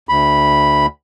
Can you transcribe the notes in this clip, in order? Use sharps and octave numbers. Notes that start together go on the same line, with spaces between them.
D2 B5